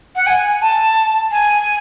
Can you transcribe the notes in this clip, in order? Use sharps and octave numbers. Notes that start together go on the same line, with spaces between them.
F#5
G#5
A5
G#5